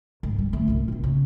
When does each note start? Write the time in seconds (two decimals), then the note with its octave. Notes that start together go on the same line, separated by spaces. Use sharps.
0.23 G#2
0.39 G3
0.53 D3 A3
0.68 C2 A#2
0.88 D1 A#1
1.04 C#3